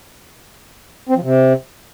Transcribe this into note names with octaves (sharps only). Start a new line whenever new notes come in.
C4
F3
C3